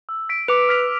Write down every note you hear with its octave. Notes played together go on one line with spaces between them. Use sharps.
E6
B6 D7
B4 D6
F6 B6 F7